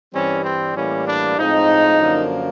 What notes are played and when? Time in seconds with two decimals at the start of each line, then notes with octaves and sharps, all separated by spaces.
0.14 G2 E3 G3 C4 C#4
0.44 C4
0.75 A2 E3 G3 A#3 C#4
1.07 D4
1.38 A2 F3 G#3 C4 D#4
2.01 F#2 D3 F3 A#3